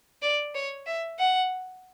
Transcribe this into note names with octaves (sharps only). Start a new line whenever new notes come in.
D5
C#5
E5
F#5